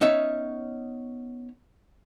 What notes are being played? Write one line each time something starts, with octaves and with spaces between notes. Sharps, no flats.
B3 C#4 D#4 C#5 E5